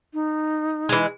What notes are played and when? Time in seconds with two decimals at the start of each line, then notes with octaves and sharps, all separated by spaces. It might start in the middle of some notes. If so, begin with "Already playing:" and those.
0.14 D#4
0.89 E3 G#3